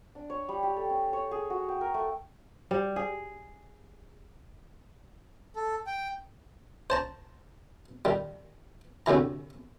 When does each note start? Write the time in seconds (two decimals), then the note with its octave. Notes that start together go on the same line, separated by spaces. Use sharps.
0.15 D4
0.30 C#5
0.49 G3
0.63 G4
0.76 A4
0.90 C#4
1.13 C#5
1.31 G#4
1.50 F#4
1.69 G5
1.81 A#4
1.94 A3
2.71 G3
2.96 G#4
5.56 A4
5.87 G5
6.90 C5 A5 A#5
8.05 D#3 G3
9.06 D2 A2 C3 E3 A#5